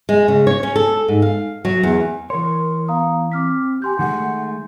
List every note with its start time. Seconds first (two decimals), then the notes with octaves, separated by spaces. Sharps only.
0.09 G#3
0.28 C#3
0.47 C#5
0.63 C#4
0.76 A4
1.08 G#2
1.22 F5
1.65 F#3
1.83 E2
2.30 E3 A#4 C#5 C6
2.88 B3 F5 A#5 D#6
3.32 C4 D6 F6 B6
3.82 G4 G#5 C6 G6
3.99 D#3 G#3 A3 F#5